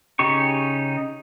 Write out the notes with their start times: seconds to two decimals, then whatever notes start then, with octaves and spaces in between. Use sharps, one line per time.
0.19 C#3 D#4 G4 C#6